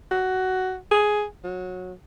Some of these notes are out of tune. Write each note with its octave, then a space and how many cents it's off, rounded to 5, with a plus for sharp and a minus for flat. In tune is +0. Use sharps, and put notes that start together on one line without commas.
F#4 +10
G#4 +10
F#3 -20